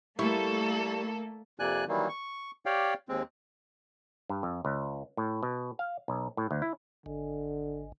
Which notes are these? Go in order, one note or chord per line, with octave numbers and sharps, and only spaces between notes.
G3 A3 A#3 E4 A4 C#6
F2 C3 A#3 D5 G#5 F#6
D#3 E3 F#3 G3 A#3
C#6
G4 C#5 D5 F5 G5
D#2 G#3 C4
G2
F2
C#2
A2
B2
F5
B1
A2
D2
E4
G#1 D3